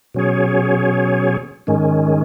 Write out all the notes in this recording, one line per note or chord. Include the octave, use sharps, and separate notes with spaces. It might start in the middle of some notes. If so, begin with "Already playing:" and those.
B2 F#3 C#4 G#4 C#5
G#2 D#3 G#3 C#4